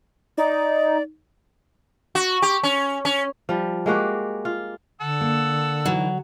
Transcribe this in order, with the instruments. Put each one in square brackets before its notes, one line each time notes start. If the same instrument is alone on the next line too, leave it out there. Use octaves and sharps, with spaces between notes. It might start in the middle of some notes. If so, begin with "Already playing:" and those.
[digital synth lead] D#4 [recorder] D5
[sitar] F#4
G4
C#4
C#4
[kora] F3 G3
G#3 A#3 F#4 G4
F4
[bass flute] D3 [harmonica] A4 F#5 E6
[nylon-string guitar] A#3
[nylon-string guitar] E3 A3 D#4 [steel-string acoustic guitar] F#3